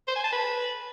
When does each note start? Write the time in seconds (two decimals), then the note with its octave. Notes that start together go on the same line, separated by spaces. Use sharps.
0.08 C5
0.16 G#5
0.24 A5
0.32 B4